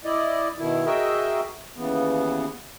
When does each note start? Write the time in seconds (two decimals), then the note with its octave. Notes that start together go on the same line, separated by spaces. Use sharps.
0.05 E4 D5 D#5
0.58 B2 D#3 E4
0.86 F#4 G#4 A#4 D#5 E5 G5
1.76 D#2 C#3 E3 B3